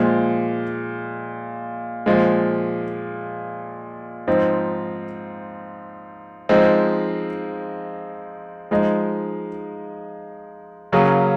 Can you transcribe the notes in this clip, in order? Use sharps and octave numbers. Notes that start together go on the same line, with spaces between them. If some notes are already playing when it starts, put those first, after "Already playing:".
Already playing: A#2 F3 G#3
A#2 F3 G#3
G#2 F3 C4 D#4
F3 G#3 C4 D#4
F3 G#3 D#4
C#3 F#3 A#3 C#4 G#4